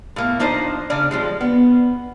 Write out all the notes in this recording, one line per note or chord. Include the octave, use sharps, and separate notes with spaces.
A2 A#3
F3 D4 D#4 C5 D#5
C#3 C#4 D4
F3 G3 G#3
B3